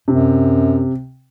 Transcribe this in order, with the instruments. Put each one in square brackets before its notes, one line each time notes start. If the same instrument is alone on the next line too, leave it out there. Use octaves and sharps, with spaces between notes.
[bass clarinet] F#2 [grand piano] C3